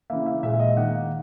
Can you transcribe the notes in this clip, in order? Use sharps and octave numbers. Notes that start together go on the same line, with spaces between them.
C#3 E3 A#3 E5
E5
A#2 G#3 E5
D#5
D#3 A#3 F#5